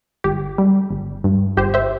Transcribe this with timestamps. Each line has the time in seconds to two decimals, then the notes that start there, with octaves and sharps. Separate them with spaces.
0.24 G1 G4
0.58 G3
0.91 G1
1.24 G2
1.57 G1 G4 C5
1.74 C5 E5